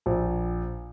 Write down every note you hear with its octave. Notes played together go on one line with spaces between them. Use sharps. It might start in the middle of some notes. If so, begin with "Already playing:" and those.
A#1